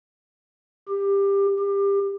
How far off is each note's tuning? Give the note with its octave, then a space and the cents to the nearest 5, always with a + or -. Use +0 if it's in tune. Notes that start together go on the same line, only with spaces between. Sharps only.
G4 +20
G4 +25